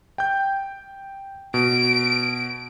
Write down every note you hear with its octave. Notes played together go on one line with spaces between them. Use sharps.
G5 G6
B2 D7